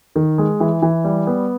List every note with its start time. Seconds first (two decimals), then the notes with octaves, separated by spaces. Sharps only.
0.16 D#3
0.38 G#3
0.60 E3
0.82 E3
1.04 G3
1.27 B3